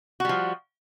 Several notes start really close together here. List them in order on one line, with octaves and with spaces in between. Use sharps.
F#4 G3 F3